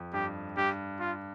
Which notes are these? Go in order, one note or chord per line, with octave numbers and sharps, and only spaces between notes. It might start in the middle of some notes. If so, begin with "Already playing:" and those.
Already playing: F2
G2 G4
G2 G4
F4